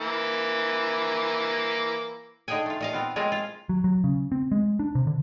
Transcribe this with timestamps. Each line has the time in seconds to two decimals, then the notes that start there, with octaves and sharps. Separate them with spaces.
0.01 E3 A#3
2.48 D3 D#4 G#4 G5 G#5
2.66 A3 F4
2.81 A#2 D#5 F5
2.93 B3 C4 F4
3.16 G#3 A#3 C4 F4 G#4
3.32 F4
3.69 F#3
3.84 F#3
4.04 C#3
4.32 C4
4.52 G#3
4.79 D4
4.95 C3
5.07 D3